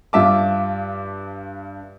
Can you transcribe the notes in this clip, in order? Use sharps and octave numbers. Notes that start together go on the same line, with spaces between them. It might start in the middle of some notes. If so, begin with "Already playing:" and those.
G2 F4 E5 A5 D6